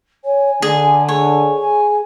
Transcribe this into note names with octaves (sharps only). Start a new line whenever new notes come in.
C#5 G#5
D3 G#4 D5
G#4 C#5 G#5
G#5